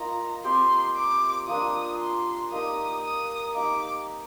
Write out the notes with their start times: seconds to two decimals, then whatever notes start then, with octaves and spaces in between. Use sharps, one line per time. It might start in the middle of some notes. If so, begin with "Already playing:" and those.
Already playing: A#3 F4 D#5 A#5
0.44 C4 G4 C5 C6
0.96 D6
1.47 F3 A#3 D4 D#6
1.99 C6
2.52 A#3 D#4 G4 A#4 D#6
3.03 D#6
3.55 A#3 D#4 G4 D6